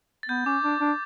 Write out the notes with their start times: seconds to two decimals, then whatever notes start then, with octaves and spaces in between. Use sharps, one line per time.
0.23 A6
0.29 B3 G6
0.46 C#4 D6
0.63 D4
0.80 D4